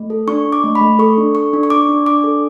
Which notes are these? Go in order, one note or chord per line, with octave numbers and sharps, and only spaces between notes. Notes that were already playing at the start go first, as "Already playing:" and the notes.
Already playing: A3
A4
D4 C#6
D4
D6
A3
B5
A3
A4 C#6
D4
A4 C#6
D4
C#6
D4 D6
D4
D4 D6
A4